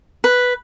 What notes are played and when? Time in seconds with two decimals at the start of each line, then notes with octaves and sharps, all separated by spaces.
0.24 B4